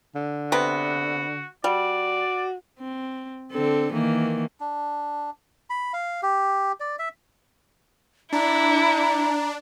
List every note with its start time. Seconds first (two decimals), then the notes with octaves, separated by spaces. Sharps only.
0.15 D3
0.52 C3 B3 F#4
1.64 G3 F#4 D5
2.79 C4
3.52 D3 C4 A4
3.93 D#3 E3 A#3
4.60 D4
5.70 B5
5.93 F5
6.23 G4
6.80 D5
6.99 E5
8.32 D4 E4 A#5